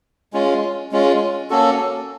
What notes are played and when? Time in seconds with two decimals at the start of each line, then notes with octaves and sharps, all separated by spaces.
0.33 G#3 C#4 F4
0.92 G#3 C#4 F4
1.50 A#3 C#4 F#4 A4